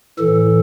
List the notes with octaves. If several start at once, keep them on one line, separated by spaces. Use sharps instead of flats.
A2 E3 A4